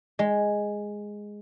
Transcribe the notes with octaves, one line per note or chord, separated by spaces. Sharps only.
G#3